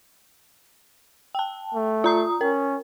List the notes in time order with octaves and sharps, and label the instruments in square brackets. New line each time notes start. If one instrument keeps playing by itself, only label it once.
[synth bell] G5 A5
[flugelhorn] A3
[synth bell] F4 A#5 D#6
[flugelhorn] C#4 [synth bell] A#4